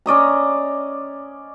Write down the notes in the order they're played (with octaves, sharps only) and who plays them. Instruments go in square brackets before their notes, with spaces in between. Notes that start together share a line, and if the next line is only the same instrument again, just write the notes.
[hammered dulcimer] C#4 D5 D#5 A#5